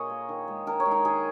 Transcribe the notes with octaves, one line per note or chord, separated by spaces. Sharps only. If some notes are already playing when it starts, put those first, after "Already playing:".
Already playing: A#2 G#4 A#4 C#5 D#5
A#3
D#3
G#3
D#3 A#4
C#5
G#3
D#4
D#3 G#4